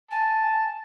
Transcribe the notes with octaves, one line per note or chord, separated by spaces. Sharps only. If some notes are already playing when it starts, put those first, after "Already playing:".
G#5 A5